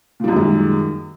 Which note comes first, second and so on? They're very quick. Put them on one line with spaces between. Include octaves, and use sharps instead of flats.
A#2 G3 F#2 D#3 G#3